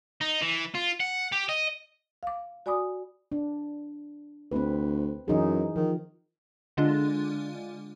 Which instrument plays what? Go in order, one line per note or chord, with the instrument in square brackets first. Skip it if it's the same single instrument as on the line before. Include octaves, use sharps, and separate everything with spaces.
[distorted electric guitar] D#4
E3
F4
F#5
G4
D#5
[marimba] F5 D6
F#4 D5 G#5 B5 D6 D#6
[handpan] D4
[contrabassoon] D2 [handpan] C4 B4
[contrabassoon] F#2 [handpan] E3 D#4 G#4
[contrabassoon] D#3 [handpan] F3
[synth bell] D3 G#3 D4 F4